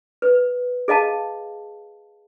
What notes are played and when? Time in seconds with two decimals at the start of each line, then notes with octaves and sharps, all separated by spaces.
0.22 B4
0.88 G#4 D#5 F5 A5